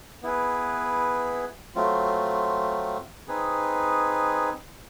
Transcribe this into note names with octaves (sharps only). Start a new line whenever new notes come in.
B3 E4 G#4 B4
F#3 A3 C4 F4
C4 D#4 G#4 B4